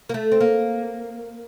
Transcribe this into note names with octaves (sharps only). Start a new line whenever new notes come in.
A#3
A3
C4
A#3